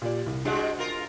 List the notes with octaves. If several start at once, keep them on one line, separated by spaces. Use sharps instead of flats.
A#2 G4 D5
C2
C3 G3 G#3 D4 F#4
F4 A#4